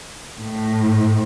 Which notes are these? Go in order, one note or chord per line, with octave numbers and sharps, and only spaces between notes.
A2